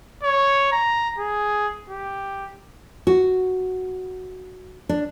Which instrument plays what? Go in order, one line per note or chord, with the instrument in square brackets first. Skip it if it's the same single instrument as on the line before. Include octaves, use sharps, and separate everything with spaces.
[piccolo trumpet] C#5
A#5
G#4
G4
[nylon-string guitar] F#4
D4